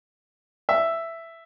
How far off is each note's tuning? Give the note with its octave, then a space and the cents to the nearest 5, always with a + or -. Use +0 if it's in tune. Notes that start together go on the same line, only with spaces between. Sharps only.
E5 +5